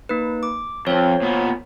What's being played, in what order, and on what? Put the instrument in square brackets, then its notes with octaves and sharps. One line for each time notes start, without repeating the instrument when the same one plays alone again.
[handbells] A#3 D#4 B4
D6
[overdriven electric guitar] F2 [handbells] C5 C#5
[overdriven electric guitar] A#2 B3